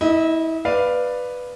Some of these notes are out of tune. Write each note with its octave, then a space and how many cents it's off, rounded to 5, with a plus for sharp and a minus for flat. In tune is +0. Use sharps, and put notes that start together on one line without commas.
E4 -30 D#5 +0
B4 +0 D5 +5 F5 +0